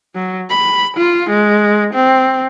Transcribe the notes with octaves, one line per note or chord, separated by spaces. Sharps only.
F#3
B5
F4
G#3
C4